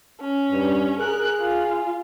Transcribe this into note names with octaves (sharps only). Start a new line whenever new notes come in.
C#4
G2
G#4 A#4 F#6
F4